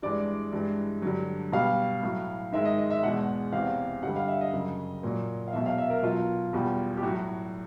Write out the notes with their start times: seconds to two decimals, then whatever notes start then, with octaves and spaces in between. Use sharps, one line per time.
0.02 G2 E3 G#3 D5
0.53 G2 E3 G#3
1.02 G2 D3 F#3
1.52 B2 G3 F5
2.03 A2 F#3
2.52 G#2 D#3 G#3 E5
2.65 D#5
2.78 D#5
2.91 E5
3.03 E2 B2 G#3 F#5
3.52 E2 C3 E3 F5
4.03 G2 D3 G3 F#5
4.16 F5
4.28 E5
4.41 D#5
4.53 F#2 C#3 F#3
5.03 A#2 F#3
5.48 F5
5.53 E2 B2 F#3 E5
5.66 F5
5.78 E5
5.90 A#4
6.03 B2 F#3 F4
6.53 E2 B2 G3
6.97 G4
7.02 A2 F#3 F#4